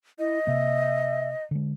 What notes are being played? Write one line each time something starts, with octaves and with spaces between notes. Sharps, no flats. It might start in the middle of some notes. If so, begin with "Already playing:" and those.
E4 D#5
C3 A#3 E5
D3 G#3